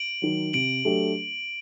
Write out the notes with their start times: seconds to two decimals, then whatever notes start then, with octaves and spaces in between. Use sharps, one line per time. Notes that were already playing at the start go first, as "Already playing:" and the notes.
Already playing: D7 F#7
0.22 D#3 F#3
0.53 C3 D7 F#7
0.85 F#3 A3 D4 G4